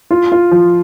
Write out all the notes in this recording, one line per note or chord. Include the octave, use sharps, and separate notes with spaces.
F4
F4
F3